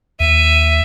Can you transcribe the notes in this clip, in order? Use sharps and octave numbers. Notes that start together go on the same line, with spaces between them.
D#2 E5 D#7